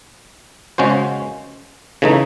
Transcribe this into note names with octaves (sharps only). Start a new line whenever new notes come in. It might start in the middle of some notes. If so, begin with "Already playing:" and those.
C#3 G#3 C#4 F#4 C5
C#3 E3 A3 D#4